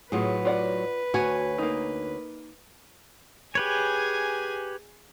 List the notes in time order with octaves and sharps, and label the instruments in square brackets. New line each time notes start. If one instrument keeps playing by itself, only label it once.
[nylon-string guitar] A2 F#3 [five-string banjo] F4 G#4 [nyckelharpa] B4
[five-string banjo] F4 D5 F#5
[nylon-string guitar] D2 C#5 G#5 [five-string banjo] F#4
[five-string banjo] A#3 D#4
[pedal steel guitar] G4 B4 C#5 [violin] G#4 G#5